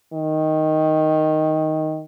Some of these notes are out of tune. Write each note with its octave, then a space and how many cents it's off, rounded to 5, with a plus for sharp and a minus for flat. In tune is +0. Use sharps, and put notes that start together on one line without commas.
D#3 +5